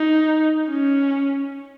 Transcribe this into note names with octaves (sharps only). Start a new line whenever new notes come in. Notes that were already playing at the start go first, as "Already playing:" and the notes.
Already playing: D#4
C#4